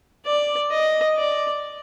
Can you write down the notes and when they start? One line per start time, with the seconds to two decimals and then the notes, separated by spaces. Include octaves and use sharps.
0.26 D5
0.72 D#5
1.17 D5